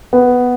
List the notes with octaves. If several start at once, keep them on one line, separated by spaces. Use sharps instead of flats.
B3